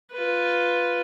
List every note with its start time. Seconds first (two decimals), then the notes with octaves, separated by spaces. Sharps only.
0.13 F4 B4